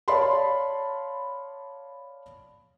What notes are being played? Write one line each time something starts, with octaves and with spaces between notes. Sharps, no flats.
C#5 D5 F5 A5 B5 C6